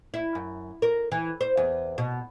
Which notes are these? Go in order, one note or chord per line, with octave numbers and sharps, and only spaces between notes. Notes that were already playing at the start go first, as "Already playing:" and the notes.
E4
F#2
A#4
E3
C5
E2
B2